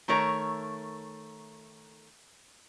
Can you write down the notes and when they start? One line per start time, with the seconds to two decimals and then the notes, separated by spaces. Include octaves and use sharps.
0.08 D#3 A3 A#4 C#5 A#5